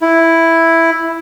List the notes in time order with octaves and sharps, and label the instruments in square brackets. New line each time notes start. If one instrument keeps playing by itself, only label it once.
[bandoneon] E4